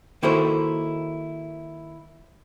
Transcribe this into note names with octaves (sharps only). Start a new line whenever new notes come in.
D#3 A#3 E4 F#4 A4 C5